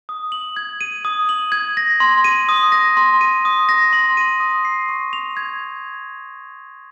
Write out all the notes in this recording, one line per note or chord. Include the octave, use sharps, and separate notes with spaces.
D#6
F#7
G#6
D#7
D#6
F#7
G#6
A#6
C6
D#7
D#6
A#6
C6
D#7
D#6
A#6
C6
D#7
D#6
C7
C#6
F7
G#6